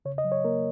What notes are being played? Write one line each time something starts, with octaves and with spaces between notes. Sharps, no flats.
C#3 C#5
D#5
F#3
C#5
A#3 A#4